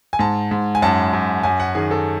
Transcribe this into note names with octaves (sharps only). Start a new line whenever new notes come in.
G#5
G#2 A5
G#2
G#5
F#2 A5
F#2
F#2 G#5
F#5
D#3 G#4
A4